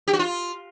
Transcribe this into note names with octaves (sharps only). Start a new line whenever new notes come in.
G4
F#4
F4